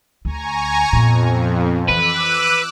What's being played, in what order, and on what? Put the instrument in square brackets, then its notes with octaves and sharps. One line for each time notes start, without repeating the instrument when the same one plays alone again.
[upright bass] D2 [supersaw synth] G#5 A#5 C#6
[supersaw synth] F2 [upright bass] A#2 B3
[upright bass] E3 [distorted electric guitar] B4 [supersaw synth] D6 E6 F#6